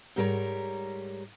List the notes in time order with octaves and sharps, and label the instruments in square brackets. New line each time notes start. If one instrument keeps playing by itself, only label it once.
[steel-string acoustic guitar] G#2 G3 A#4 B4 C#5 A#5